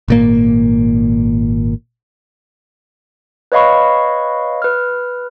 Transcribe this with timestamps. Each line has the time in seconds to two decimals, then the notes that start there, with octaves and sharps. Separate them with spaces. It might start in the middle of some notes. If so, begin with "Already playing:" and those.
0.08 G#1 A#2 A#3
3.52 B4 C#5 D#5 F5 B5 C#6
4.62 B4 F6